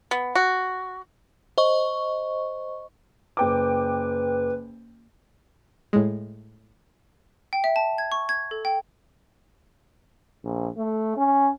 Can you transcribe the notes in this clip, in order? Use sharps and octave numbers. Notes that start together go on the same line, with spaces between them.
B3
F#4
C5 D#5 C#6
F#1 B4 G5 D6
A2 G#3
G5
E5
A5
G#6
C#6
G#6
A4
G5
A#1
A3
C#4